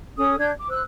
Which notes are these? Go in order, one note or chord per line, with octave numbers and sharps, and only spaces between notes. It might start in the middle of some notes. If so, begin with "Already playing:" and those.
C#4 A4 D#6
D4 G6 G#6
D6
C5 E6 F#6